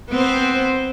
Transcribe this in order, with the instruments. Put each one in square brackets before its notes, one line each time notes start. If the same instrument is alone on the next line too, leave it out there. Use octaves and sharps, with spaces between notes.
[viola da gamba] B3 C4 C5